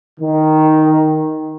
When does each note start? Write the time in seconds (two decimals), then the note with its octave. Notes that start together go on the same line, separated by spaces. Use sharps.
0.19 D#3